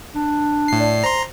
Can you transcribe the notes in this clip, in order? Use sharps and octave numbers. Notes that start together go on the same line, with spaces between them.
D4
A2 C7
D5 A5
C5 A#5 C6